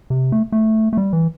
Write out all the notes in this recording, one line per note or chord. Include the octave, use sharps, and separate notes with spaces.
C3
A3
A3
A3
G3
E3